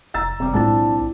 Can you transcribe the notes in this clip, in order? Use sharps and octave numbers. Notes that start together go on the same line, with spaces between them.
F1 A#5 E6 A6
F1 C3 G3
B1 A2 G#3 C4 D4 E4 F4 A5